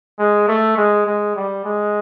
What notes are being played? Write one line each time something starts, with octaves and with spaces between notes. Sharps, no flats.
G#3
A3
G#3
G#3
G3
G#3